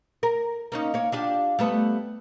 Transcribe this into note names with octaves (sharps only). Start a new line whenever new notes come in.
A#4
A#3 C#4 D#4
A#3 C#5
D4 F4 G4
G3 A3 B3